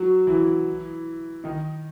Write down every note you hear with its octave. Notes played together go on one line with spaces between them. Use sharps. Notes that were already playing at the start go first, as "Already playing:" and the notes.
Already playing: F#3 F#4
E3 E4
D#3 D#4